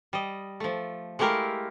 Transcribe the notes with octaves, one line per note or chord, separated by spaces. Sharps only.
G3 D#5
F3 A3
G#3 A3 E4 G4 A#4 F5